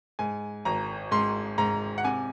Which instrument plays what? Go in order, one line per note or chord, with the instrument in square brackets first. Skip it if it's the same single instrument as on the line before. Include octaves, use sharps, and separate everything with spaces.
[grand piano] G#2 G#5
G#1 A#5
G#2 C6
G#2 A#5
F#5
C3 G#5